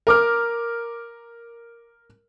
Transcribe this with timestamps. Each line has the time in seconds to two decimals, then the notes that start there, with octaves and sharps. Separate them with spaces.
0.07 A#4 D6 F6